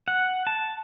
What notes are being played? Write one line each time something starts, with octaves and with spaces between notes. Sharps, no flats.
F#5
A5